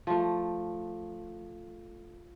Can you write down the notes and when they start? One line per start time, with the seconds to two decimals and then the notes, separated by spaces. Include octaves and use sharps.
0.07 F3 A3